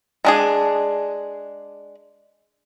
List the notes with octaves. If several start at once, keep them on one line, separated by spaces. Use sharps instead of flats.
G#3 D4 G#4